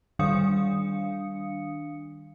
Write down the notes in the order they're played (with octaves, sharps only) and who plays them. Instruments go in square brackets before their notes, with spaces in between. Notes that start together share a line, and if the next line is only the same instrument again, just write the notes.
[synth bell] D#3 G3 D4 F5 D#6 C#7